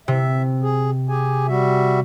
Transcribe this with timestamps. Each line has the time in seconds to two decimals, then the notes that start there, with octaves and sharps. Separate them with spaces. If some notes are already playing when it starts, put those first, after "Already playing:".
0.08 C3 E5
0.62 G#4
1.09 G4 G#4 G#5
1.48 G3 F#4 E5